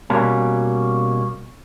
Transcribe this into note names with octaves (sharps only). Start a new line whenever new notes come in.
B2 G3 A#3 C#4